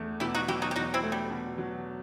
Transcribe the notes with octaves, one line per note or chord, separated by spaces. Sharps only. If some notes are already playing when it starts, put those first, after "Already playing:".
Already playing: E2 A3
B2 E4 G4
D#4 F#4
F#3 E4 G4
D#4 F#4
G4
E2 D#4 F#4
C4 E4
A3
G3
B2
F#3